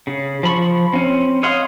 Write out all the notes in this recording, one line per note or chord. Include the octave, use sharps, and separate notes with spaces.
C#3
F3 B5 C#6
C4 C#4
C#5 D#5 F5 F#5 C6